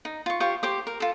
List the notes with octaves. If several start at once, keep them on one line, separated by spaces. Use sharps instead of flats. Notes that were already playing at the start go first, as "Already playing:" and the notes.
D#4
F4 C#6
F4 G4 C5 C#6
G4 C5 D6
A#4
F4 A4